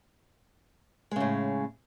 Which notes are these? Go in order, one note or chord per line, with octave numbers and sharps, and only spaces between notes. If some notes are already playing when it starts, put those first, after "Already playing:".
A2 C#3 G#3